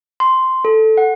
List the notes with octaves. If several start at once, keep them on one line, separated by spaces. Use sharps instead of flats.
C6
A4
F#5